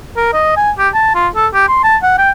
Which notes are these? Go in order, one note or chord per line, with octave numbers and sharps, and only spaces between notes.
A#4
D#5
G#5
G4
A5
F4
A4
G4
C6
A5
F#5
G5